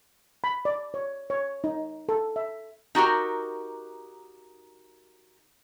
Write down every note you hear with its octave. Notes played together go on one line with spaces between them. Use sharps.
B5
D5
C#5
C#5
D#4
A4
E5
D#4 F#4 G4 A#4